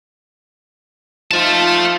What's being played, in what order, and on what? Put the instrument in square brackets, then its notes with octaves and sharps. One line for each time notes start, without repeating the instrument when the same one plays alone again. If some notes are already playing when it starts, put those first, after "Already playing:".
[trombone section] F3 D#4 F4 [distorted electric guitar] E5 A5